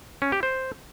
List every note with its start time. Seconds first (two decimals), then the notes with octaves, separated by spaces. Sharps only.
0.22 C#4
0.32 G4
0.43 C5